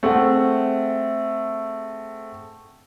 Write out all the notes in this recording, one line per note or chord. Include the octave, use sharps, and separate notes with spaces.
A3 C4 G#4 F#5